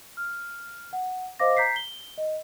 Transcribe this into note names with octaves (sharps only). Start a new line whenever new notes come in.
F6
F#5
C5 D#5 F5 D6 A#6
A#5 G6 B6 C7
G7
D#5